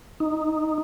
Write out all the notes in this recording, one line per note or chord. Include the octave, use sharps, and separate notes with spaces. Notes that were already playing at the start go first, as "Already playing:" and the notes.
D#4